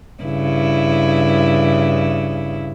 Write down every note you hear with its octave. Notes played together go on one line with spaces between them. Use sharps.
G2 C#3 E4